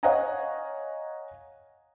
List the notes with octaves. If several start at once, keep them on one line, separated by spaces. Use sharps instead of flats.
C#5 D#5 F5 F#5 G#5 A#5